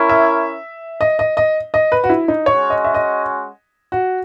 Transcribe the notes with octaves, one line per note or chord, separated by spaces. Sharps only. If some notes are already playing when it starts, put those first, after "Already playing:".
Already playing: C#4 E4 A#4
E5
D#5
D#5
D#5
D#5
B4
F#4
E4
D#4
G#3 C#4 F#4 C#5
D#5
E5
D#5
F#4